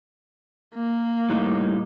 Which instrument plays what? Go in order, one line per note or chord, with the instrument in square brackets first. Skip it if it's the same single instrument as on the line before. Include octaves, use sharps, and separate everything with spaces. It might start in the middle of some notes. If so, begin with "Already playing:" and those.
[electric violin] A#3
[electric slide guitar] A2 G3 D#4